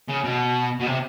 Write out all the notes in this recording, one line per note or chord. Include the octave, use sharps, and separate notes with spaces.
C#3
B2
B2
C3